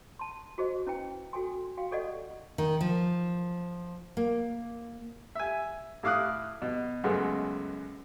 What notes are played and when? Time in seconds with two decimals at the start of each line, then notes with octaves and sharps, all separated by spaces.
0.19 A5 C6
0.58 F#4 G#4 C5 D#5
0.87 C#4 E4 B4 G5
1.33 F#4 A4 G5 G#5 C6
1.77 F#4 F5 G5
1.91 G4 A4 D5 D#5 F#5
2.58 D#3
2.81 F3
4.17 A#3
5.35 E5 G#5
6.03 A2 E4 F5 D6 D#6 F#6
6.62 B2
7.04 C#2 F#2 G#3 A3 B3 F#4